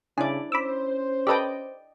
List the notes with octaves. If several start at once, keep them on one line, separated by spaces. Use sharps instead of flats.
C#3 D4 E4 G#4 D5
C#4 C5 B5 D6 E6
G4 A4 B4 D5 D#5 G5